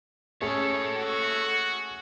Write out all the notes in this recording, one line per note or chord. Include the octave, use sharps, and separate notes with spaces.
A3 C#4 G#4 A4 C#5
F#4